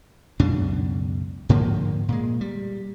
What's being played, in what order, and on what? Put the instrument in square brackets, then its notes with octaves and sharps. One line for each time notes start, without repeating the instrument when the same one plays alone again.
[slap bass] C#2 F#2 B2 D4
G#2 D3 F3 A#3
A#2 G#3
G3